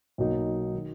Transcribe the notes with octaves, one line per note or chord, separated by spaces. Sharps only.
B1 B2 A#3 D#4
D#3